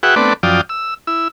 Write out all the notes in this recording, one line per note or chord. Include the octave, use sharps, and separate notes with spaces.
F#4 G#4 B4 E5 F#5 G5
A3 B3 C4 D4 B4 D5
F#2 F3 D5 F5 G5 D#6
E6
E4 E6